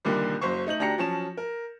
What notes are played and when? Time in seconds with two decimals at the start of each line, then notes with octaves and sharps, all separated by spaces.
0.05 C2 A#2 D3 D#3 G3
0.41 F#1 F#3 C5 C#6
0.67 A3 D#4 G6 F#7
0.80 D2 D4 G4 A#5 A#6 C#7
0.98 F3 F#3 C#4 A5 E7
1.37 A#4